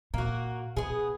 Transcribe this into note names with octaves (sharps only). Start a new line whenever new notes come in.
A#2 A#3 F#4
B2 B3 G#4